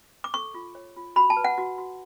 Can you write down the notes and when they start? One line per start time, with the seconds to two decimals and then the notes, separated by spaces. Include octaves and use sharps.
0.24 D6
0.34 A4 C#6
0.54 F4
0.75 C#5
0.97 F4
1.16 F#4 B5
1.30 A5
1.36 B4
1.44 F#5
1.58 F#4
1.78 F#4